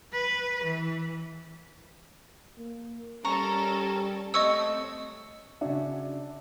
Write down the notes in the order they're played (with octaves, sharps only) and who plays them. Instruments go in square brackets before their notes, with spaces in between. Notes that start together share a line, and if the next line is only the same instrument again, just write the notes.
[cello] B4
E3
[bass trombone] A#3
[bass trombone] G3 [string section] C#4 A4 A#4 [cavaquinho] A#5 C#6
[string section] A3 C4 A4 [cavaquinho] C#5 D#6 [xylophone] D#5 C#6 E6
[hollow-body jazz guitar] C#3 C#4 F#4 [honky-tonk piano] D4 [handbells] E5